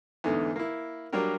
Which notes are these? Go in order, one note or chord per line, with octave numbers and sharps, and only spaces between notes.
E2 G#2 D3 A3
A#3 E4
F#3 G3 A#3 D4 G4 A#4